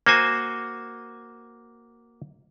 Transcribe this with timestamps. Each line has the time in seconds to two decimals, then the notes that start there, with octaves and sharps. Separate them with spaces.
0.07 A#3 F#4 C5 G#5